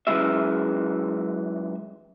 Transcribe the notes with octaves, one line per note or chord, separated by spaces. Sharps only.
F#2 E3 F#3 G#3 G#4 E5